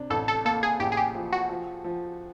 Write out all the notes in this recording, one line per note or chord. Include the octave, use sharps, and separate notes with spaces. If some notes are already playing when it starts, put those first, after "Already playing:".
Already playing: C3 D4
A1 A4
A4
A#3 A4
G#4
A1 G4
G#4
G4
F3
F#4
F3
F3